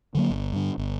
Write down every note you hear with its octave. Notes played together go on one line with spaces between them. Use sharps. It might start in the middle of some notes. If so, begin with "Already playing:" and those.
D3 F#3 A#3
G1
G2 D3
G1